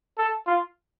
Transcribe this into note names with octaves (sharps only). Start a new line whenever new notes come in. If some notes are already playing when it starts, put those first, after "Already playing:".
A4
F4